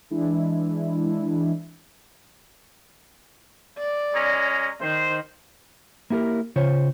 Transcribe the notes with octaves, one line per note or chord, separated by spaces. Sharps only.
E3 G#3 D4 E4
D5
G#3 C#4 A#5
D#3 C5
A#3 E4 G4 G#4 A#4
C#3 F4 C5 C#5